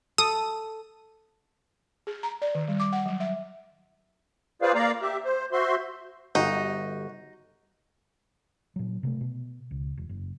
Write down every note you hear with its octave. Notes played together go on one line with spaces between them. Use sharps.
A4 D#6
G#4
A#5
D5
D#3
G3
D6
F#5
F#3
E5
F4 G#4 B4 C5 D5 F5
A#3 D5 F5 A#5
G4 E5
C5
F#4 C5 E5 C6
G1 D#4 F#4
A#2 F#3
C3 G#3 A3
B2
C#2
E1
F#1